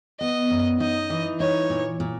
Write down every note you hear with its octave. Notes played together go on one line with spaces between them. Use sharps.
B3 D#5
F#2
D#4 D#5
E3
D#4 C#5
A#2
A#2